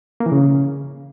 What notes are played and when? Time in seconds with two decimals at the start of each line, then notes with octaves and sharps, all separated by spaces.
0.20 A#3
0.26 E3
0.32 C#3